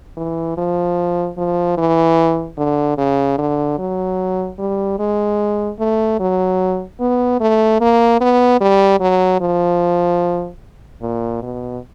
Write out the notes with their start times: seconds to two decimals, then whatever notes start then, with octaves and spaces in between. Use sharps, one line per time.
0.17 E3
0.58 F3
1.37 F3
1.78 E3
2.58 D3
2.98 C#3
3.38 D3
3.79 F#3
4.59 G3
4.99 G#3
5.79 A3
6.20 F#3
7.00 B3
7.41 A3
7.81 A#3
8.21 B3
8.61 G3
9.00 F#3
9.41 F3
11.02 A#2
11.42 B2